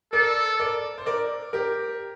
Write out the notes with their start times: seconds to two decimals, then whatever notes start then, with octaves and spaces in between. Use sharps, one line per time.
0.12 A4 A#4 D5
0.60 A#4 D5
0.98 C5
1.06 A#4 D5
1.53 G4 A#4